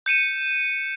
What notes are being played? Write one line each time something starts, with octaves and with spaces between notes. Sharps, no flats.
G6 C#7 D#7 E7